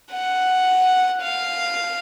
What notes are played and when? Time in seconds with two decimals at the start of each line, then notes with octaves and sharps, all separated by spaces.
0.12 F#5
1.22 F5